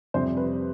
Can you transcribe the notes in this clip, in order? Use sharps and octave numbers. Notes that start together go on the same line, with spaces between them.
F2 C3 G3 C5
B4